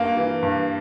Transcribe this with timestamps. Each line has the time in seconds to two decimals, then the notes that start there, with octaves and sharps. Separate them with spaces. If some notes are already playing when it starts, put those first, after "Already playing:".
Already playing: G2 A#3
0.17 E3
0.43 G2